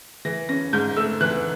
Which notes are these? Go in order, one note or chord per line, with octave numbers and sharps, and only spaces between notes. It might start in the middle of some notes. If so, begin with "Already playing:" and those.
E3 A#6
C#4 A#6
G#2 G6
A3 E6
E3 F#6